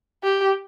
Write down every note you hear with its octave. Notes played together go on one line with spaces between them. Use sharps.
G4